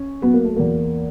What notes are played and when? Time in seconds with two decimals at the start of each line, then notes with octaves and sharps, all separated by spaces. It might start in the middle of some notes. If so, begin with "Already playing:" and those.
Already playing: C#4
0.22 F#3 B3
0.34 A#3
0.44 A3
0.56 E2 A#3